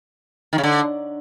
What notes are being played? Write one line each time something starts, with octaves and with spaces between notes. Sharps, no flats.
D#3
C#3
D3